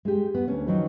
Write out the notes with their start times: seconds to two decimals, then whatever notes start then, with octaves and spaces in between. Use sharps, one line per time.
0.05 G#3 G4
0.35 B3
0.48 D2 C#4
0.67 D#3 F3 F#3 C#4 D#4 B4